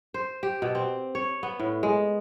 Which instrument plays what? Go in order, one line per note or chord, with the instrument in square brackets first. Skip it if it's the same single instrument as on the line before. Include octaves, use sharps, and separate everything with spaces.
[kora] C5
G4
B2
C4
C#5
B3
A2
G#3